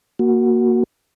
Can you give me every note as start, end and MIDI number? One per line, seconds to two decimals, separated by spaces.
0.19 0.83 58
0.19 0.83 66